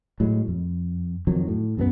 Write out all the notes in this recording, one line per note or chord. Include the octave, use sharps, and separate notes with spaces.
A2 F#3 G#3
F2
F2 D#3 F#3
A2
B1 F#2 E3 B3